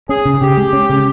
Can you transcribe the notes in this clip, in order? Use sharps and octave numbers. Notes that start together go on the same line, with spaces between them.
C#4 G#4
C#3
C#3 G4
G#3
C#4
C#3